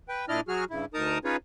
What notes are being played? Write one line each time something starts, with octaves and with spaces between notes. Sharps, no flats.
B4 G5
A#2 D4 E4 D5 D#5 F6
F#3 F#4 G#4 F6
G2 C#3 E4
D2 D#4 A#4 A5 A#5 D#6
C#4 D#4 F4 G#4 B4 C#5